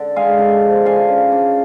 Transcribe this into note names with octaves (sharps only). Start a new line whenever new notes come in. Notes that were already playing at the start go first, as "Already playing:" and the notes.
Already playing: D3 D4 D5
G#3 F5 G#5
D4
F3
D4 F5 G#5
C#3
D4